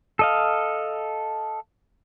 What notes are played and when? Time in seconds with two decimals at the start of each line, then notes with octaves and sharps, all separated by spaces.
0.19 A4 D#5 F5